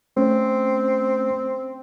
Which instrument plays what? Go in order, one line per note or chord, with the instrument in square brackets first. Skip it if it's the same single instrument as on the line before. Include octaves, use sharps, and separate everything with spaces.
[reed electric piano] A3 C#4 [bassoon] C4